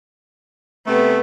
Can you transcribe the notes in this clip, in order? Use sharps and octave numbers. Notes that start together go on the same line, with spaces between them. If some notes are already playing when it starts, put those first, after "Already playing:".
C3 A3 B3